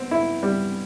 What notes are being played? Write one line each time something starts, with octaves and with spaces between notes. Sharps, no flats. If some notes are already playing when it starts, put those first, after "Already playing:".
Already playing: B3 C4
E4
G3